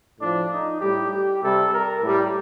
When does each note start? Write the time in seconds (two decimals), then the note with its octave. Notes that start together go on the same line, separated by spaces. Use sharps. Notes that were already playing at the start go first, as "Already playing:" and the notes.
0.19 A2 F3 D4
0.50 D#4
0.81 A2 G3 G4
1.11 G4
1.41 C3 G3 A4
1.72 A#4
2.02 A2 G3